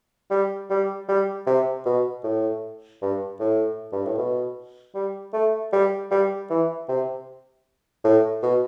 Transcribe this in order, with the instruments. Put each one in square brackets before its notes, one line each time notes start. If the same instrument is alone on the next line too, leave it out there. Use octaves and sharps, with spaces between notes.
[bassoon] G3
G3
G3
C3
B2
A2
G2
A2
G2
A2
B2
G3
A3
G3
G3
E3
C3
A2
B2